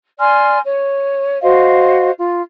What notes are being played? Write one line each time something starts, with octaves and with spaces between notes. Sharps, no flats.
D5 G#5 C6 F6
C#5
F#4 C5 D#5 F5
F4